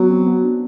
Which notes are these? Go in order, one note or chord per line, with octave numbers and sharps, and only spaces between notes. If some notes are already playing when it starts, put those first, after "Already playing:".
Already playing: F#3 B3
C4
B3
D4